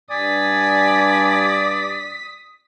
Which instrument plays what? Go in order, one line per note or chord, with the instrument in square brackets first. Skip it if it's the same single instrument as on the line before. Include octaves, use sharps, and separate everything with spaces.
[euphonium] G2 [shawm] D5 [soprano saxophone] G#5 [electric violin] D#6 B6